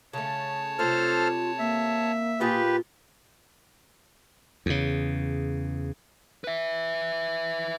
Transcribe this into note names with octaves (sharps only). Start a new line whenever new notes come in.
C#3 A3 C#5 A5
C3 A3 F4 A4 C5 F6
A#3 E5
A#2 F4 G4 G#4 B4
E2 C#3
B4 E5